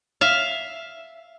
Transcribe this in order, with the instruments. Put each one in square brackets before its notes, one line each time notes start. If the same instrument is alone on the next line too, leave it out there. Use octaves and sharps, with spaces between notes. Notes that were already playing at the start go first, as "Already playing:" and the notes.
[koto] E5 F5